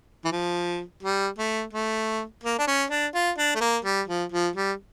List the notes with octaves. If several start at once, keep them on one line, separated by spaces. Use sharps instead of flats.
E3
F3
G3
A3
A3
A#3
D4
C#4
D4
F4
D4
A3
A#3
G3
F3
F3
G3